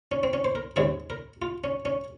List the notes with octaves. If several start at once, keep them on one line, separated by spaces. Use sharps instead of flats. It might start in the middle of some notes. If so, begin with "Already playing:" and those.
C#4
C4
C#4
C5
A#4
D#2 C#3 G#3 C4 G#4
A#4
F4
C#4
C#4